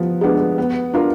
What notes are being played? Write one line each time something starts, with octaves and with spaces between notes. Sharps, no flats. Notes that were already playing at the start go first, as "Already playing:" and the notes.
Already playing: F3 B3
G#3 B3 D4
B3
D4 F4 A#4